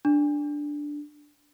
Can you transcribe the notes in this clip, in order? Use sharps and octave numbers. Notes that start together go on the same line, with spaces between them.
D4